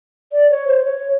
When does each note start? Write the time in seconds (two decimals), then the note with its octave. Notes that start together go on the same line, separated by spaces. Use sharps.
0.32 D5
0.50 C#5
0.67 C5
0.85 C#5